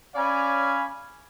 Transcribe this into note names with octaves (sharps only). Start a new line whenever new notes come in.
C#4 C#5 D5 F5 G#5 B5